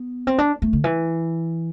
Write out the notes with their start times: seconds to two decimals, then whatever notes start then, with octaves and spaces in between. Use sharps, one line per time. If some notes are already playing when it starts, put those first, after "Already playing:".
Already playing: B3
0.27 C4
0.38 D4
0.62 A3
0.73 D3
0.84 E3